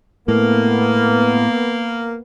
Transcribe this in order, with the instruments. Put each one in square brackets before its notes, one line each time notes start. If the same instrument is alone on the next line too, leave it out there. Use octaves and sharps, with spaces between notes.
[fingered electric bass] A2 [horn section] A#3 [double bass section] B3